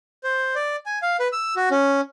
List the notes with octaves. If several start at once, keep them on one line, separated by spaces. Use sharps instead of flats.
C5
D5
G#5
F5
B4
E6
F#4
C#4